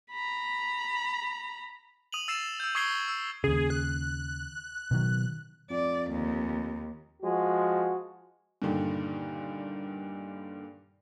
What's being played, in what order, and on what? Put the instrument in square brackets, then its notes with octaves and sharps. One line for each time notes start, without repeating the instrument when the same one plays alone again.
[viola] A#5 B5
[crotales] D#6 D#7 F7 F#7
E6 A6 C7 E7
E6 G6
C#6 D#6 G#6 C7 D7 G7
E6
[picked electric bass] D#2 C#3 [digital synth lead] G#4
[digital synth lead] F#6
[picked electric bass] B2 D#3 F#3
[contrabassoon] F2 [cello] D5
[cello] D#2
[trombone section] F3 G#3 F#4
[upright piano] G2 A#2 D3 D#3